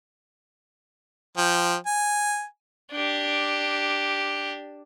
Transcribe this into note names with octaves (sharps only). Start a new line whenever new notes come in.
F3 G5
G#5
D4 G4